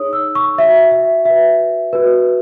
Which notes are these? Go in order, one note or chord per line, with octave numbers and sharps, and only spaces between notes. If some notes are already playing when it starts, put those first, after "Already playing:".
Already playing: D#4 G#4 C#5 D#6
E6
C#6
F#4 C#5 E5
E5
F#4 B4 E5
F#4 B4